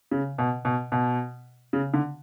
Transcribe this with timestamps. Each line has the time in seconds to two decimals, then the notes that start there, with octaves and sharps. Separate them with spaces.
0.11 C#3
0.38 B2
0.65 B2
0.92 B2
1.73 C#3
1.94 D3